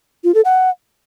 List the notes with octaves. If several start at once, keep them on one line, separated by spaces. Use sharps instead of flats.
F4
A4
F#5